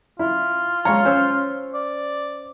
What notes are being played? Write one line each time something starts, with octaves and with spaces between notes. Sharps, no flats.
E4 F4
G#3 C#5 F5 A#5 C#6
C#4 C5 C#5 E6
D5